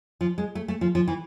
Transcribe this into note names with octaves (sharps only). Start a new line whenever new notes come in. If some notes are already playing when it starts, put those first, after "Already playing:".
F3
G#3
A3
A3
F3
F3
E3